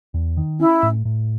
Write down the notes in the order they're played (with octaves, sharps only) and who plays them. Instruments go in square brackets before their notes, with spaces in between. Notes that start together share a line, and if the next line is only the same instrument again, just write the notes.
[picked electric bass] E2
D#3
[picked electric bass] C#4 [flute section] E4
[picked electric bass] A2
A2